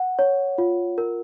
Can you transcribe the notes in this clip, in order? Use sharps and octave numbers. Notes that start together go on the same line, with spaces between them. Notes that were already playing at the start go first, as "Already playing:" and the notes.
Already playing: F#5
C#5
F4
A#4